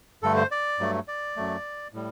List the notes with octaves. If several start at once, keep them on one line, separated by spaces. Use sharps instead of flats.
G2 D3 A3 A4
C5
D5
G2 F#3 A3
D5
F#2 F#3 A3
A2 G3